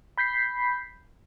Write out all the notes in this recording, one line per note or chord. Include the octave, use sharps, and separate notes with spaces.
B5 G6 B6 C7